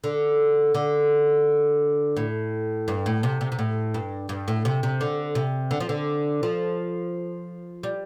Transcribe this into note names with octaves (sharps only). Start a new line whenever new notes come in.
D3
D3
A2
G2
A2
C3
C3
C3
A2
G2
G2
A2
C3
C3
D3
C3
D3
F3
D3
F3
G3